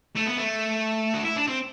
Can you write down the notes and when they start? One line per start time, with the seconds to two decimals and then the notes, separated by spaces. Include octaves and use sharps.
0.15 A3
0.26 B3
0.37 A3
1.14 F#4
1.25 E4
1.37 D4
1.47 C4